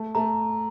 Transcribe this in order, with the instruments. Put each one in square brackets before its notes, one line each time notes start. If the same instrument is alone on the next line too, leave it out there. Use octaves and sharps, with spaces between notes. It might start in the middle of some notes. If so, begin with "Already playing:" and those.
Already playing: [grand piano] A3
[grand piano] A3 [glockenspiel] A#5